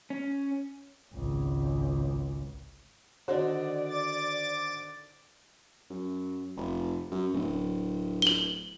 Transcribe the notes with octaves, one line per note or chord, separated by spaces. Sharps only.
C#4
G#1 C#2
D3 D#3 D4 F#4 C5 D5
D6 A6
F#2
F1
F#2
D1
F#7 G7